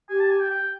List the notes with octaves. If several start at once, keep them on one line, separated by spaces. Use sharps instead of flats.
G4 G#5
A5
G#5
G5
G5